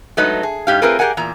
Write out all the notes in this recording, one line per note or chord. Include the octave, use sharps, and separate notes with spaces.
F#3 G#3 A3 D#4 B4 D#5
G#4
G#2 G4 F5
A3 C4 F4 G#4 A#4 B4
G4 G#4 A#4 F#5 G#5
E2 A#2 A#5